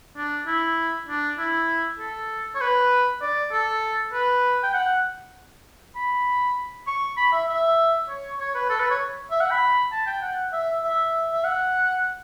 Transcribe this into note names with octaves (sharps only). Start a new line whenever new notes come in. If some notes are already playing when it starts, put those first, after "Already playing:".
D4
E4
D4
E4
A4
C#5
B4
D5
A4
B4
G5
F#5
B5
C#6
B5
E5
E5
C#5
C#5
B4
A4
B4
C#5
E5
F#5
B5
A5
G5
F#5
E5
E5
E5
F#5